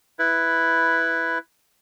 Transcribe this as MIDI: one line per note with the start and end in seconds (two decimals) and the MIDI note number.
0.19 1.38 64
0.19 1.38 71